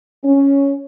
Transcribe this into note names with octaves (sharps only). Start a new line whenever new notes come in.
C#4